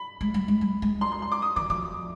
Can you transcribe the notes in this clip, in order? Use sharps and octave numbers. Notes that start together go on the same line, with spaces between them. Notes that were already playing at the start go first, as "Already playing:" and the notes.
Already playing: B5
G#3
G3
G#3
G3
G#3
C6
C6
C6
D6
D#6
D#3 D6
F3 D6